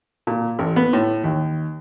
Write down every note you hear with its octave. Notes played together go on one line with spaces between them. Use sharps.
A#2
A1
B3
A2
D#2